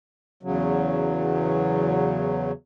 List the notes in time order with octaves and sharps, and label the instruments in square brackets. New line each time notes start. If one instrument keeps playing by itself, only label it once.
[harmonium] E2 C#3 F#3